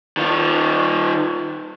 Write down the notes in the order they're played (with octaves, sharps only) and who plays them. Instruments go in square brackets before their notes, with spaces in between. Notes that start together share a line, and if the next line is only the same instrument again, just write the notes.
[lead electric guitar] D#3 F4